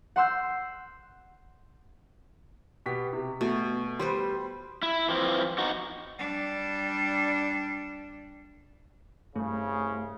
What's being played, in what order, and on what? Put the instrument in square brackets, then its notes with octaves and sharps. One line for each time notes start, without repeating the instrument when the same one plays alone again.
[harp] F#5 C6 E6 G6
[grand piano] B2 G4 B6
C3
[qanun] B2 [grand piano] A3
[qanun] G3 B4 C5 [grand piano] C6
[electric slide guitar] E4
E3 F3 C4
D#4 F#4
[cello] G3 D4
[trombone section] C2 C#3 [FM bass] G2 [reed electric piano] A3